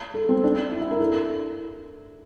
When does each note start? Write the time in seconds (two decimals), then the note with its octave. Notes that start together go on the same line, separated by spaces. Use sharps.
0.14 A4
0.29 C4
0.44 D4
0.71 E4
0.81 E4
0.91 A#4
1.00 A4